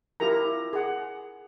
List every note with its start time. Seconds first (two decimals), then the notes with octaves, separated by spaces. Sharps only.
0.20 E4 F4 G4 A#4 A#5
0.73 G#4 F#5